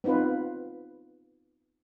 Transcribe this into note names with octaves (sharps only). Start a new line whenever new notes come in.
B3 C4 D#4 F4 B4